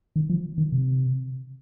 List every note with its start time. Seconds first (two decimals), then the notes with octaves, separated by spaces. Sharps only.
0.16 D#3
0.30 F3
0.58 D#3
0.72 C3